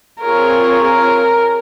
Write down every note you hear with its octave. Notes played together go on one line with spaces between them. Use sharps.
C4 F4 G#4 A#4 C#5
A#4